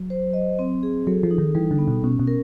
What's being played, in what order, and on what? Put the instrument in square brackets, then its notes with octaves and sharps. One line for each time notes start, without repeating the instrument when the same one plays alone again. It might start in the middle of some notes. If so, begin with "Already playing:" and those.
Already playing: [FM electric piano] F#3
[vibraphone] C5
D#5
C4
G#4
[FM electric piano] F#3 [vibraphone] A4
[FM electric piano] F3
[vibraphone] D#4
[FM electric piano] D#3
[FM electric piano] E3 [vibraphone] G3
[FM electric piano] D3
[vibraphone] B3
[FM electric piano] B2
[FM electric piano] B2 [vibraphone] C#4
[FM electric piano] B2
[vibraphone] A#4